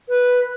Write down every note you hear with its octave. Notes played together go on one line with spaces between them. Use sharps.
B4